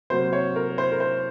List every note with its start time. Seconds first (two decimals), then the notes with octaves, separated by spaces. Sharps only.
0.10 C3 F#3 A#3 C5
0.33 C#5
0.56 A#4
0.78 C5
0.92 A#4
1.00 C5